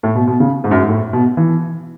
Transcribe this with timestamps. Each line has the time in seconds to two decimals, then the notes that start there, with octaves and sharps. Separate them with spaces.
0.03 A2
0.15 B2
0.27 B2
0.40 C#3
0.64 G#2
0.71 F#2
0.79 G#2
0.88 A2
1.13 B2
1.37 E3